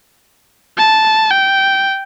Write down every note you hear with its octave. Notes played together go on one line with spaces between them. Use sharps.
A5
G5